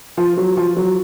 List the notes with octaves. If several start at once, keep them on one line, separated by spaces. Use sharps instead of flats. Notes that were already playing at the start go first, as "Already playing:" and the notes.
F3
F#3
F3
F#3